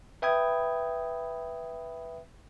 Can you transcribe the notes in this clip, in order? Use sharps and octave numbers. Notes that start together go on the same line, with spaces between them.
B4 E5 G5 B5 D#6 G#6